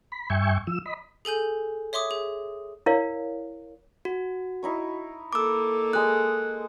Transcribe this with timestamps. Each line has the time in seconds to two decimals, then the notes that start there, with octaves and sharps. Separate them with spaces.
0.12 B5
0.30 G2 E5 G5 G#5 C#6
0.67 F3 E6
0.86 D#5 B5
1.25 G#4 A4 G#5 G6
1.93 C#5 E5 C6 D6 D#6
2.11 G#4
2.86 E4 A#4 C#5 D5 F5
4.05 F#4
4.63 D#4 E4 C#6
5.33 A#3 A4 D6 E6
5.93 G#3 D#6 F#6